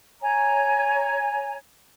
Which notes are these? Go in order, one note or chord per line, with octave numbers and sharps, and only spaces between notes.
C#5 G#5 A#5